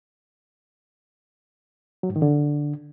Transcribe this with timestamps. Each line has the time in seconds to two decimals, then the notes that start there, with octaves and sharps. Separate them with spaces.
2.03 F#3
2.10 G#2
2.16 D#3
2.22 D3